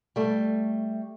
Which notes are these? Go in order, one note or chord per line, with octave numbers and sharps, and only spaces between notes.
G3 A3